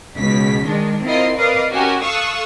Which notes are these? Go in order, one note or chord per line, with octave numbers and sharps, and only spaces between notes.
C#2 B2 B6
D#3 G#3 D4
C4 E4 F4 A#4 D#5 C7
A#4 B4 D5 D#5 F5
C#4 F#4 G4 A#4 G#5
A4 F5 C#6 D#6 E6 F#6